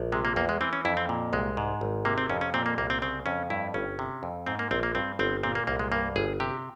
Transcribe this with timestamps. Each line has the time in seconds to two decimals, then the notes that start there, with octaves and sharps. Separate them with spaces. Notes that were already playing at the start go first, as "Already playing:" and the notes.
Already playing: A#1
0.12 C3 G#3
0.25 A#3
0.36 E2 A#3
0.49 G#3
0.61 E3 C4
0.73 C#4
0.85 F2 E4
0.97 C4
1.09 A#2
1.33 C2 G#3
1.57 G#2
1.81 G#1
2.05 C3 A#3
2.18 C4
2.30 F2 C#4
2.41 C#4
2.54 A#2 C4
2.66 A#3
2.78 C2 A#3
2.90 C4
3.02 C#3 C4
3.26 F2 C#4
3.50 G2 E4
3.74 G1 C#4
3.99 C3
4.23 F2
4.46 G#2 C4
4.59 A#3
4.71 A#1 C4
4.83 A#3
4.95 G2 C4
5.19 G1 C4
5.43 A#2 C4
5.55 A#3
5.67 C2 A#3
5.79 G#3
5.92 G2 A#3
6.16 G1 G#4
6.40 C3 G4